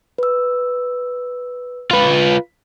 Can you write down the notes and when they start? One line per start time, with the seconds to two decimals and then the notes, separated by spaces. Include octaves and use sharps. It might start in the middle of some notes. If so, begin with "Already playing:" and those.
0.18 B4 E6
1.91 F4 B4